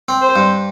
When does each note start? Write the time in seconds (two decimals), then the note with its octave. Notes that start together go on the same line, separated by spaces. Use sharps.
0.08 C4
0.22 C5
0.36 G2